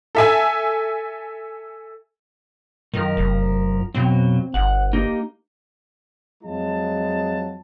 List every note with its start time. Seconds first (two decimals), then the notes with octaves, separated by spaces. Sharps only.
0.15 A4 E5 G#5
2.94 F#2 D#3 F3 A#4
3.17 F1
3.95 F2 B2 F#3 C4
4.54 G1 F#5
4.93 A#3 D#4 G4
6.44 F2 F#3 G#3 F4 A5